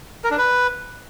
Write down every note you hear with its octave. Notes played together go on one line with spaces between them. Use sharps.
A#4
D4
B4